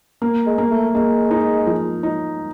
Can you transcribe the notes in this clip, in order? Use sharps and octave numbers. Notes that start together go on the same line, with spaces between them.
A#3
G#3
A#3
A3
G#3 A#3
D#4
F3
D#4